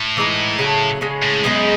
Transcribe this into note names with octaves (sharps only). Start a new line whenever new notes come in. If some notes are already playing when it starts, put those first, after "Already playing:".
Already playing: A2
E3 G#3 D#4
C#3 F#3 A3
C#3 G#3 C#4
A2
F#2 G#3 B3 D#4 G#4